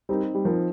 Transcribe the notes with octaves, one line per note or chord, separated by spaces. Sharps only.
G3 C4 D#4 A#4
G3
F3 C4 D#4 A#4